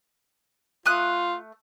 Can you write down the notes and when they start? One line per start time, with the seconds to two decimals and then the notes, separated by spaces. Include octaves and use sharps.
0.86 A3 F4 D#6 F#6